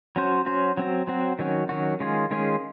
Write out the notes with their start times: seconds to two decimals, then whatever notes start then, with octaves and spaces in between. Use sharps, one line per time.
0.16 F#3 C#4 F#4 C5
0.46 F#3 C#4 F#4 C5
0.77 F#3 C4 F#4
1.07 F#3 C4 F#4
1.39 D#3 F#3 C#4 F#4
1.69 D#3 F#3 C#4 F#4
2.00 D#3 G#3 C#4 F4 G#4
2.31 D#3 G#3 C#4 F4 G#4